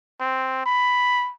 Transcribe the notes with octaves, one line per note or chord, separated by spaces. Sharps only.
C4
B5